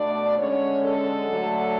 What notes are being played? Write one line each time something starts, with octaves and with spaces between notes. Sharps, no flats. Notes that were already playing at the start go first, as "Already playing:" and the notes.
Already playing: B2 A3 D4 D5
D3 G#3 C#4 C#5
A4
D3 F#3 A3